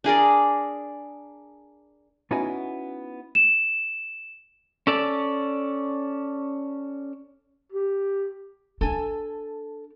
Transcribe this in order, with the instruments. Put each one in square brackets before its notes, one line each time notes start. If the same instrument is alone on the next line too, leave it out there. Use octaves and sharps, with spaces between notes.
[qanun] D4 G#4 A#4 D5
[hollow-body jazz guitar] B3 C#4 D#4 E4 F#4 G#5
[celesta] E7
[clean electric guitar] C#4 A4 D5
[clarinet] G4
[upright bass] D4 [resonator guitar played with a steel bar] A4 G#5